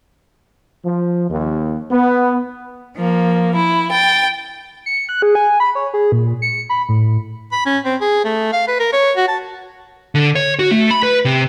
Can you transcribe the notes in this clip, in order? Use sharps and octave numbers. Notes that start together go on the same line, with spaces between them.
F3
D#2
B3
F3 A#3
E4
G5 A6
C#7
F#6
G#4
G#5
B5
C#5
G#4
A#2
C#7
B5
A2
B5
C#4
C4
G#4
A3
F5
B4
A#4
C#5
F#4
A5
D3
C#5
F#4
A3
B5
B4
C3